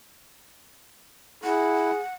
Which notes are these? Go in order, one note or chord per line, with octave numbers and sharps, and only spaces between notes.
E4 G#4 F#5